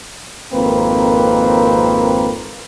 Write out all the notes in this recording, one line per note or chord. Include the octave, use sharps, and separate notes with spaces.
G#1 F2 A#3 C4 A#4 B4